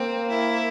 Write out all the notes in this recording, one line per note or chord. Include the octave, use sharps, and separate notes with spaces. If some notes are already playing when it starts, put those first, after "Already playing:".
Already playing: A#3 C4
E4